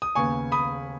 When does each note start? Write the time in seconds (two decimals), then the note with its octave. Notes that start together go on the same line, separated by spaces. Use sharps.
0.02 D#6
0.15 D#2 C#3 B3 G#5 C#6
0.52 B5 D#6